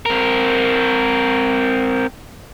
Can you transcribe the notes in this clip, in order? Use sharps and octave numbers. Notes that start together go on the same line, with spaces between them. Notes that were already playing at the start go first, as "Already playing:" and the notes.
C4 A#4